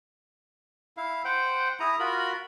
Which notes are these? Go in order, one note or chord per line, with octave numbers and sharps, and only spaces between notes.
E4 F5
C5 F#5 G5
E4 G#4 A#5 D#6
F4 F#4 A#4 B5